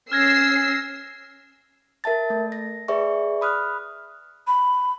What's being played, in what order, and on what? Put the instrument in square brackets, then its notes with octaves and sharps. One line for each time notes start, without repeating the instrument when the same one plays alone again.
[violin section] C#4 E6 C7 [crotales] F6 G#6 A#6
[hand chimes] A#4 E5 A5 A6
A3
A#6
G#4 B4 D5 E5 C#6
B5 D#6 F6 F#6
[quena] B5